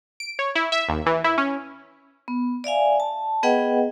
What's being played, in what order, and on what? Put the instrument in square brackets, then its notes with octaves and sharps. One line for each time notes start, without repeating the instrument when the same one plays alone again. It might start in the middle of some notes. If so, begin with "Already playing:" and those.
[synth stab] D7
C#5
E4
E5
D#2
E3
E4
C#4
[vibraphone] B3
D5 E5 F5 G#5
A5
B3 G#4 B4 D#5 F#5 G5